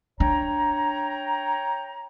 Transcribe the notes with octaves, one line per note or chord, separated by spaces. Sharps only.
D4 C#5 G5 A#5